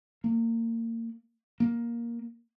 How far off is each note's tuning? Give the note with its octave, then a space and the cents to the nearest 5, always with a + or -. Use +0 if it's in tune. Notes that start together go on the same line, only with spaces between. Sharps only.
A#3 -30
A#3 +10